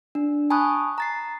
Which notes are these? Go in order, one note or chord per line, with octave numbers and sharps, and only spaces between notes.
D4
G#5 A5 B5 C#6 D#6 F#6
A#5 A6 C7